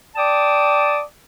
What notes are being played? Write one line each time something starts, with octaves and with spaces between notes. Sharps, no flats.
D5 G5 A5 D6 D#6